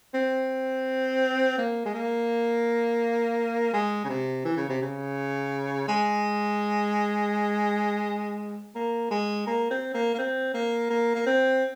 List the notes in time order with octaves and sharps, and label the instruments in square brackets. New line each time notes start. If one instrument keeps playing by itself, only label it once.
[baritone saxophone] C4
A#3
G#3
A#3
G#3
C#3
C3
E3
C#3
C3
C#3
G#3
A#3
G#3
A#3
C4
A#3
A#3
C4
A#3
A#3
A#3
C4